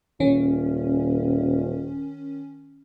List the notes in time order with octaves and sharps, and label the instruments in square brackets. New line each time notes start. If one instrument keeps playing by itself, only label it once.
[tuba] D#1 [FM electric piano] D#3 C#4